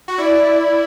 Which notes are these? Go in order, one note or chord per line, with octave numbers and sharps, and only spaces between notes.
F#4
E4 D5
D5